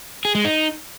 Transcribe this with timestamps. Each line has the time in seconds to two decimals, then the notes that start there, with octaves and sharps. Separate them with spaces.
0.25 G#4
0.35 G#3
0.45 D#4